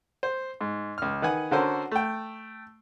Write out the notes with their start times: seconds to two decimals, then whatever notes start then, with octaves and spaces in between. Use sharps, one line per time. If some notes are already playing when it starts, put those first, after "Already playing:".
0.23 C5
0.61 G#2
0.98 C#2 F6
1.22 D#3 B4 F#5 G#5
1.51 D3 C#4 F#4 A4 A#4 C5
1.91 A3 G5